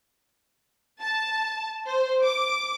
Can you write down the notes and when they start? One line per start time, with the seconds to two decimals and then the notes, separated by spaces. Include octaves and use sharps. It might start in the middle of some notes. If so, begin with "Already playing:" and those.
1.01 A5
1.87 C5
2.22 D6